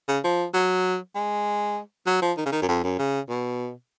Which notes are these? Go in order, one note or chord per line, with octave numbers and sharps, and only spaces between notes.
C#3
F3
F#3
G#3
F#3
F3
D#3
C#3
D#3
F#2
F2
F#2
C#3
B2